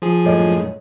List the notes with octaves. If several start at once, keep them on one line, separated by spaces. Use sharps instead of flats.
F3 G#4
F#2 A2 A4 C#5 D#5